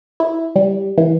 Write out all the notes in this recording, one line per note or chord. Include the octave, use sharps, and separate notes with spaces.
E4
G3
E3